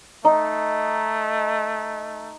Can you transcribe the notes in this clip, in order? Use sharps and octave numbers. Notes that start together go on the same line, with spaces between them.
A3 D#4